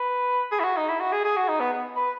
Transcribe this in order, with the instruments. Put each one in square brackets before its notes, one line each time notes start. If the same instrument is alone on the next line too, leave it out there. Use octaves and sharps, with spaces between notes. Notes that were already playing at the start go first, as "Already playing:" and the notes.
Already playing: [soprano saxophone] B4
G#4
E4
F#4
D#4
E4
F#4
G#4
G#4
F#4
D#4
B3
B3
B4